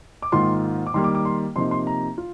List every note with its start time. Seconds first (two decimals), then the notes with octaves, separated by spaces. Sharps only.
0.22 D6
0.32 G#2 D#3 A#3 F4 C6
0.87 D6
0.94 D#3 G3 A#3 C6
1.04 D6
1.15 D6
1.25 C6
1.56 C3 F3 A#3 D#4 C6
1.71 C6
1.87 A#5
2.18 F4